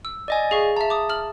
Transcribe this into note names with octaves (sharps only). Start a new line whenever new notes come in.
E6
D5 D#5 G#5
G#4 F5 C#6
E5 A5 A#5
D6 D#6
F6 F#7